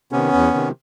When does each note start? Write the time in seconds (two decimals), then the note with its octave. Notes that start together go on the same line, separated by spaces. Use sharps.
0.12 C3 D#3 B3 C#4
0.33 E2
0.54 C3 D#3